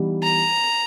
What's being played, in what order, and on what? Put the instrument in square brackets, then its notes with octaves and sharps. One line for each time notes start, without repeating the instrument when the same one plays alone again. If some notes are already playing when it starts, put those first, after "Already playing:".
Already playing: [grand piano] E3 G3 B3 D#4 G4
[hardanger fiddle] A#5